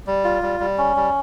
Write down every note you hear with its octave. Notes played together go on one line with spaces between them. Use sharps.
G3
F4
G3
G3
C#4
G3